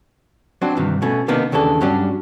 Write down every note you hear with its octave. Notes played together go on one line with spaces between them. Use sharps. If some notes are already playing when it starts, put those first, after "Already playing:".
F#3 C4 D4
G2 C3 D#3 E3
B2 A3 C#4
C3 D#3 A#3 B3 D4 D#4
D#2 C#3 E3 D4 A4
G2 F#3 C#4 D4